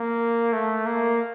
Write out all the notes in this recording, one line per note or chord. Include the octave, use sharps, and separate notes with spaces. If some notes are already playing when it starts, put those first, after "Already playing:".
Already playing: A#3
A3
A#3